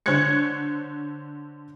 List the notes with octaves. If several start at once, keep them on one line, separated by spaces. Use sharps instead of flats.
D3 C5 C#5 F#6 G#6 C#7